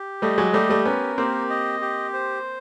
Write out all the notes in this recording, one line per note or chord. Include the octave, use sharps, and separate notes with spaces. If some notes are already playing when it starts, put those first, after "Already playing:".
Already playing: G4
G3 A3 D#5
F#3 G#3
G3 A3 G4
G3 A3
B3 C#4 A#4
A#3 C4 G4
D#5
G4
C5